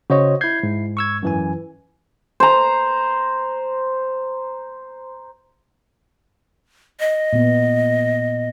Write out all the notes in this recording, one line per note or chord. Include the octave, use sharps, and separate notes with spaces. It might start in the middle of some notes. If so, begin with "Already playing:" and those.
C#3 F#4 C5 C#5 D#5
E4 G6 G#6 C7
G#2
C#6 E6 G#6
F#2 E3 G#5
C5 A#5
D#5
A#2 B3